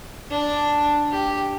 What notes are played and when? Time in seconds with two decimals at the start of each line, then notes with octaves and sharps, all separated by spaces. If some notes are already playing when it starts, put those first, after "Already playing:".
0.31 D4
1.11 G4